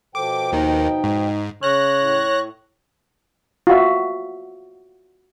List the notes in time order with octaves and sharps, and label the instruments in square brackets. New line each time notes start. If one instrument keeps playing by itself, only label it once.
[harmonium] B2 F3 G5 [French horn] A4 [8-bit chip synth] D6
[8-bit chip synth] D#2 D#3 [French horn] D#4
[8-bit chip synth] G#2
[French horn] C#3 [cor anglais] C#5 [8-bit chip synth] F#6 A#6
[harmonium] A2
[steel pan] F4 F#4 E5